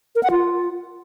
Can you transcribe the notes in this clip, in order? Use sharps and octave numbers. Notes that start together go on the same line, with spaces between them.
A#4
F#5
F4